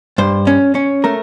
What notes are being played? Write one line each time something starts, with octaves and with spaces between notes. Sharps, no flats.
G2 C5
C#4
C#4
A3 A#4